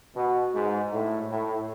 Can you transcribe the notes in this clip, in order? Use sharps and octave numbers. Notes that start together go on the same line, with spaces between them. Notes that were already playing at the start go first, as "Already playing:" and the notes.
B2
G#2
A2
A2